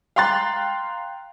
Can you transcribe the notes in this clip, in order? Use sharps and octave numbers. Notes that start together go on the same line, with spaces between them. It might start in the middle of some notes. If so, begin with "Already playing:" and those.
F5 G5 A#5 C6 F#6 A6